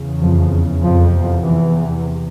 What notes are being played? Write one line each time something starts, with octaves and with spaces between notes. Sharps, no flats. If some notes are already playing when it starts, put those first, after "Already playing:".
Already playing: E2 C#3
F2 F3
F2 F3
E2 C3
E3